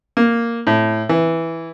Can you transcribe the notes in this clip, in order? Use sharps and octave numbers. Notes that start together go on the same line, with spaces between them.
A#3
A2
E3